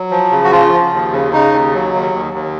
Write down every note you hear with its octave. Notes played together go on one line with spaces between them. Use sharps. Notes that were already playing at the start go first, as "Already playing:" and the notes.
Already playing: F#3
F3
C#3
F#4
F3 F4
F3
D#2
C#3
C#3 D#4
D#2
F#3
D#2
D#2
D#2